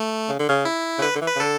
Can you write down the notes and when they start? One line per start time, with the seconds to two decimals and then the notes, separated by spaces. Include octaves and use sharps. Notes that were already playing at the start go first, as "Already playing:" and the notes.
Already playing: A3
0.29 C#3
0.39 D3
0.49 C#3
0.65 E4
0.98 C#3
1.02 D3 B4
1.15 D3
1.21 E3
1.26 B4
1.35 C#3
1.40 D3 A4